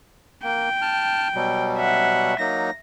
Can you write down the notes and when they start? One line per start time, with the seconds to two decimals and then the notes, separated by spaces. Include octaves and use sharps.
0.44 A#3 G5
0.82 A5 F6
1.35 B2 F#3 G3
1.77 E5 F#5
2.39 F#3 A#3 D#4 A#6